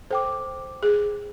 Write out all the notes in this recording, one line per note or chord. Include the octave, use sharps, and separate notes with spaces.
A4 C5 G5 D6
G#4